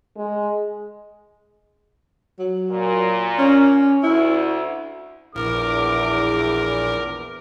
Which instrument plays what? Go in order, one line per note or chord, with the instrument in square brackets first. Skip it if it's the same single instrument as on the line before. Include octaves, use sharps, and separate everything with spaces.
[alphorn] G#3
[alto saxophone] F#3
[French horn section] A#2
[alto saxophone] C#4
[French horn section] D2 [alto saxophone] E4
[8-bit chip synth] A#1 [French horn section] E2 [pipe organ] A#4 [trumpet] D6